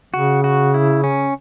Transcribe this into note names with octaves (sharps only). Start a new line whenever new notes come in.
C#3 F#4
F#4
E4
C#4